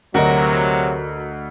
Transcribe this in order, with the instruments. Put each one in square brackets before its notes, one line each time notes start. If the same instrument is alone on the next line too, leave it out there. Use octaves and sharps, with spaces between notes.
[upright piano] D2 D#5 [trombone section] C3 F#3 [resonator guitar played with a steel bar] F#4 A#4